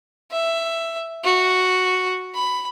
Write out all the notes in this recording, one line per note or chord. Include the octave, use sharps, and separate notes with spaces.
E5
F#4
B5